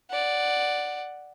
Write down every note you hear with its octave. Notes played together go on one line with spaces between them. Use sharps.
D5 F#5